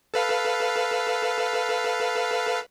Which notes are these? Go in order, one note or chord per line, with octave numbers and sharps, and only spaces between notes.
A4 B4 F5